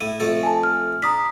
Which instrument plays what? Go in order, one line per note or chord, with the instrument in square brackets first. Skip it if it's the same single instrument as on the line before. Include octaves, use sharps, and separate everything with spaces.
[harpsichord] A2 E4 [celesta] D#7
[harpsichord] F2 A3 A4
[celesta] G#5 A5
F6
[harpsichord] D4 [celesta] A#5 D#6 B6